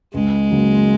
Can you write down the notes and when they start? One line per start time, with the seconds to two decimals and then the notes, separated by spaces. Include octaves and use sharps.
0.14 C#2 G#3
0.51 C#3 F#3 A#3